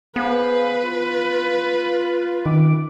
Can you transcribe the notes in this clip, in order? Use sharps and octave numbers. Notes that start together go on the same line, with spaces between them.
B3 G#4 B4 C5 F5
F4
F#2 D#3 C4 D6